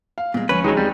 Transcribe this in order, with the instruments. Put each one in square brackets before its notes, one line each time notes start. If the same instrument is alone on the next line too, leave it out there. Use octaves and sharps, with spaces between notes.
[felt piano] F5
[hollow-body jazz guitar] A#2 G#3 [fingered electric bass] G3 A#3 B3
[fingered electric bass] D2 F3 G#3 [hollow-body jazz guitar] C#4 [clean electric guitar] B4
[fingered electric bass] C2 E3 [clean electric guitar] D#3 F#3 [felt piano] G#3 D#4
[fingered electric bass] D#2 F#3 C4 [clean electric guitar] G3